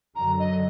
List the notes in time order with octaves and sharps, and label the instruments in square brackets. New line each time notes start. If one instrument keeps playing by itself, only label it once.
[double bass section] F#2 D3 F#3 [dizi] A#5
[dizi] D#5